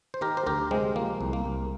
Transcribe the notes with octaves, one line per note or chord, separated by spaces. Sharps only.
C5
D#3 G4 A#4
C5
D2 G4 A#4
C3 G#3 C4
F3 A#3
C2
A#3
C2